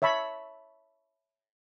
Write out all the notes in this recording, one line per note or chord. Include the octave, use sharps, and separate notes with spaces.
C#5 E5 A5 B5 C#6